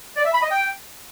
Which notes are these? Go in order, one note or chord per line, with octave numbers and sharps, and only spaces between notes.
D5
E5
B5
D#5
G5